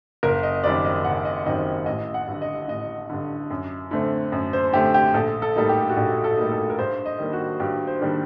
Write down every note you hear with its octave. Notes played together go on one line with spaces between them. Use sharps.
F#1 A#4
D#5
F#2 D#3 G3 C4 D5
D#5
F#1 F#5
D#5
F#2 D#3 G3 C4 D#5
A1 D#5
F#5
G2 D3
D#5
A1 D#5
G2 D3
F#2
D3 A3 C4
F#2
C5
D3 A3 C4 G4
G4
A#1 A4
A4
A2 G3 A#3 D#4 A4
G4
F#4
A#1 G4
A4
A2 G3 A#3 D#4
A4
A#4
G2 C5
D#5
D#3 G3 A#3 D4
F#4
G2 G4
C5
D#3 G3 A#3 D4